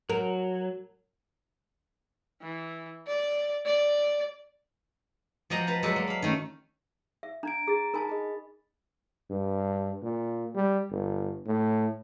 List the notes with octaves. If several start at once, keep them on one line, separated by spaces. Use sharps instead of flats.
F#3 A#4
E3
D5
D5
F3 G4 D#5 F#5 A#5
B4 A5 A#5
F#3 G#3 A4 B4 D5 E5
A#3
F5 B5
D#3 A3 C#4
E5
D4 A#5 G#6 D7
G#4 A#5 A6
D#4 A#4 G#5 A5 B5 A6
G#4 D#5
G2
A#2
G3
G1
A2